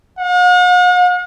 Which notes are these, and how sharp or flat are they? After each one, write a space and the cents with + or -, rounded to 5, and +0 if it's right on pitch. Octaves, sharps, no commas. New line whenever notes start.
F#5 -45